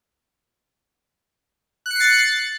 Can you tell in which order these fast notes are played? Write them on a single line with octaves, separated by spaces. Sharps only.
F#6 C#7 C7 A6